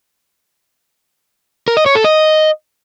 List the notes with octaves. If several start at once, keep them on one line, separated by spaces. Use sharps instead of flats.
A#4
D#5
C#5
A4
D#5